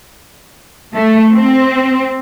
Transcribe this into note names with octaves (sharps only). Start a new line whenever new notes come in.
A3
C4